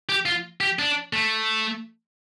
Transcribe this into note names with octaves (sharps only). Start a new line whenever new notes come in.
G4
F4
G4
D4
A3